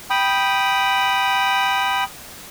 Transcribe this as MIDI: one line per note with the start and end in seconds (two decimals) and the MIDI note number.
0.10 2.04 79
0.10 2.04 83
0.10 2.04 87